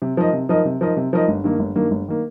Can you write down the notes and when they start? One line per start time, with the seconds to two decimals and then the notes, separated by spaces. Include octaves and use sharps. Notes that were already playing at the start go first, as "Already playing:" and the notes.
0.02 C3
0.17 F3 D#4 A#4 D#5
0.33 C3
0.49 F3 D#4 A#4 D#5
0.65 C3
0.81 F3 D#4 A#4 D#5
0.97 C3
1.13 F3 D#4 A#4 D#5
1.28 G1
1.44 G2 D#3 A#3
1.59 G1
1.75 G2 D#3 A#3
1.91 G1
2.08 D#3 A#3